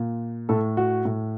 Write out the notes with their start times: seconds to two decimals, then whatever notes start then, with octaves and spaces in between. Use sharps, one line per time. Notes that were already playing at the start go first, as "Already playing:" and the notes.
Already playing: A#2
0.49 A2 A4
0.77 F#4
1.05 A2